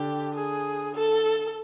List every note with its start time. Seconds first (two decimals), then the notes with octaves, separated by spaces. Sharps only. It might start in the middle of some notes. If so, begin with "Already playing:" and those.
Already playing: D3 D4 G4
0.34 G#4
0.95 A4